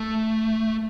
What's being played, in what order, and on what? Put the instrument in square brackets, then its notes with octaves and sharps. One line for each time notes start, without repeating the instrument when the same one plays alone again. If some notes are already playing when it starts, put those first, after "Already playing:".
Already playing: [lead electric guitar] A3